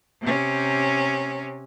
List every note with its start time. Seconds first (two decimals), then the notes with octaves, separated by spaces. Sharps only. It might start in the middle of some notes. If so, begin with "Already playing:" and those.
0.21 C3 C#4